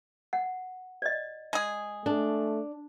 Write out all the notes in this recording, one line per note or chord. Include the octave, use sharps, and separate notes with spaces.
F#5
D5 D#5
G#3 G#4
A3 D4